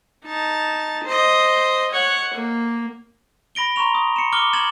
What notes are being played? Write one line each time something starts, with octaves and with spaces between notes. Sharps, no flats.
D#4 A5
C5 D#5
C#5 F#5
A#3
B5 A#6 D7 G7
A#5 C6 C#6 F7
D#6
C#7 E7
D6 F6 G7
F6 G#6 A6 E7 F#7